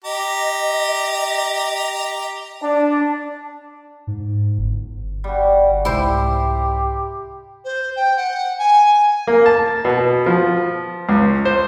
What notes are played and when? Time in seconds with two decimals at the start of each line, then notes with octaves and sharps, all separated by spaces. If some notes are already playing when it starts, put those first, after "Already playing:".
0.05 G4 D#5 A#5
2.63 D4
4.07 G#2
4.58 G1
5.24 G3 F#4
5.85 C2 G#2 E4 G4 C5
7.64 C5
7.96 G5
8.16 F#5
8.58 G#5
9.27 A#3
9.46 A5
9.85 B2
10.26 F3
11.09 C#2
11.45 C5